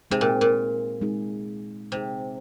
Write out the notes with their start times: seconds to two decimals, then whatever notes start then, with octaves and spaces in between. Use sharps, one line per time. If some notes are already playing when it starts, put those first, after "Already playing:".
0.11 C3 G#3 C4 D#4 G#4
0.21 A#2
0.41 A#2
1.01 G#3 C4 D#4 G#4
1.92 C3 G#3 C4 D#4 G#4